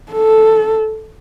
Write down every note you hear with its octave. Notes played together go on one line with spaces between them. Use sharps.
A4